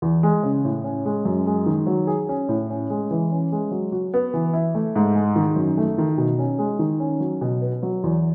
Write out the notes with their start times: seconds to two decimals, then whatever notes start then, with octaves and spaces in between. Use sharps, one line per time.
0.02 E2
0.23 G#3
0.43 C#3
0.65 A2
0.84 C#4
1.05 G#3
1.25 F#2
1.46 G#3
1.66 D#3
1.87 F#3
2.07 G#4
2.29 C#4
2.49 A2
2.70 C#4
2.90 G#3
3.11 E3
3.31 C#4
3.52 G#3
3.71 F#3
3.92 F#4
4.14 B3
4.34 E3
4.53 E4
4.75 A3
4.96 G#2
5.15 G#3
5.36 D#3
5.56 F#2
5.77 A3
5.98 D#3
6.18 B2
6.39 C#4
6.59 G#3
6.79 D#3
7.00 C#4
7.20 F#3
7.41 B2
7.61 B3
7.83 F#3
8.03 E2